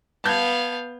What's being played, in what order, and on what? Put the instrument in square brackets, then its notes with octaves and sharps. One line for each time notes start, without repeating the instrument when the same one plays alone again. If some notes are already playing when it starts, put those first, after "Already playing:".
[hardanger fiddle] B3 F5 [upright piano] A5 G6 G#6